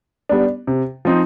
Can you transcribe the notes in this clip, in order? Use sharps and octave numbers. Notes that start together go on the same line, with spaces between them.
G3 B3 D4
C3
F3 C4 D#4